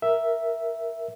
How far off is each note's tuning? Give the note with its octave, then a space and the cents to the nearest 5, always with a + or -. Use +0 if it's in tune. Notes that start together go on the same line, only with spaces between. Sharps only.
A#4 +5 E5 +0